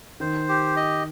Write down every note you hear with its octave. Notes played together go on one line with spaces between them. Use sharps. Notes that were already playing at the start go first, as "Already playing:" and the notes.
D#3 C5
G4
D#5